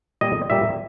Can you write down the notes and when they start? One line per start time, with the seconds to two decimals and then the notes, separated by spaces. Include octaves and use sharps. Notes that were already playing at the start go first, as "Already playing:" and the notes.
0.21 A#2 G3 A#3 D#5
0.50 A#2 G3 A#3 E5